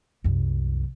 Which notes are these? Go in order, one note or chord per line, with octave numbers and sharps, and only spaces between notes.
C2 F#2